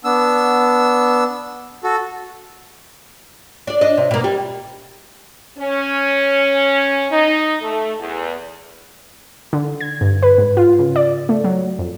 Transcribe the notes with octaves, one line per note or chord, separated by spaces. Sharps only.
B3 D4 E6
F#4 A4
D4 D5
D4 D#5
C3
B2 A#3
G3
C#4
D#4
A3
E2
D3
G#6
G2
B4
G#2
F4
C#3
D5
A3
F#3
F2